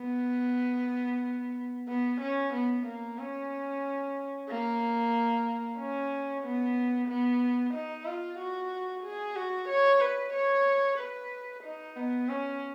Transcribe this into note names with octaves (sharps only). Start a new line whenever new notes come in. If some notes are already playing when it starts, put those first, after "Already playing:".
Already playing: B3
B3
C#4
B3
A#3
C#4
A#3
C#4
B3
B3
D#4
F4
F#4
G#4
F#4
C#5
B4
C#5
B4
D#4
B3
C#4